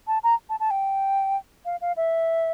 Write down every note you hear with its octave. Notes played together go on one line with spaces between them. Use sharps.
A5
A#5
A5
A5
G5
F5
F5
E5